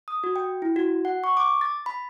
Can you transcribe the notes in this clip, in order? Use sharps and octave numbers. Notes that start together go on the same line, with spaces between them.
D#6
F#4
G5
E4
F#4
F#5
C#6
D6
A6
B5